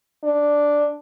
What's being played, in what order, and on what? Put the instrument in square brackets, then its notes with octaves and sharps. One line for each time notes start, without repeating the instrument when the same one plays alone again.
[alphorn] D4